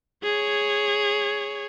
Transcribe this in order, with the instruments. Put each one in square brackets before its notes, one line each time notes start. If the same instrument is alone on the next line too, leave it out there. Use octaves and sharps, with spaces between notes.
[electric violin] G#4 C#5